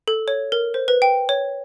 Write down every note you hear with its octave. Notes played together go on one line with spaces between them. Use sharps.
A4
C#5
A#4
C5
B4
G5
C#5